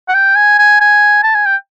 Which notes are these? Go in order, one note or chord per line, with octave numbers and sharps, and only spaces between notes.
F#5
G5
G#5
G#5
G#5
A5
G#5
G5